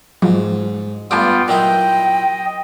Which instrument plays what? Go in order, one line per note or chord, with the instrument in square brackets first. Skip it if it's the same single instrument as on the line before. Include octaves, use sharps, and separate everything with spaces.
[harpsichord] G#2 [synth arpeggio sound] F3 F#3
[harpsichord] G2 D4 [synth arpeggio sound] A3 G#5 D6 [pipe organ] B3 F4 G5
[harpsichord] A#2 F#3 E4 [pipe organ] D#5 [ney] G5